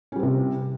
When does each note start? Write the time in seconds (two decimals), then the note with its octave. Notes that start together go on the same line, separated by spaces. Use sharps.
0.12 C#4
0.16 G3
0.19 C4
0.23 C3